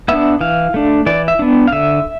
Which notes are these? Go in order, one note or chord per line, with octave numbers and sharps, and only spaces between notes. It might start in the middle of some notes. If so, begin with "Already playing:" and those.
B3 D4 E5
E3 F5
A3 D4
E3 D5
E5
B3 D4
F5
D3 E5